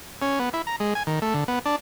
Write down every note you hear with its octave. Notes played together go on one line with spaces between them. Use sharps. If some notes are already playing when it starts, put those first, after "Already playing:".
C#4
B3
E4
A#5
G#3
G#5
D#3
A3
D3
B3
D4